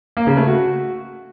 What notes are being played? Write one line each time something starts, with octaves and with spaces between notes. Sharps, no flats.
A#3
C#3
A3
F#4